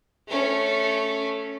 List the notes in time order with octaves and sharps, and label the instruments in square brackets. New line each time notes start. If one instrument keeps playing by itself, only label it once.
[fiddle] A3 C#4